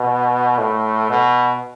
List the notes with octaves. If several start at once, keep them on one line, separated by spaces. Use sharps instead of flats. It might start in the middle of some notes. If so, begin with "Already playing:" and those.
Already playing: B2
A2
B2